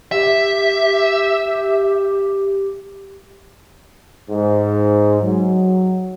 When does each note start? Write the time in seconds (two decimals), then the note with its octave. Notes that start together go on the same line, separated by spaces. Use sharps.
0.12 G4 E5
4.29 G#2
5.21 F#3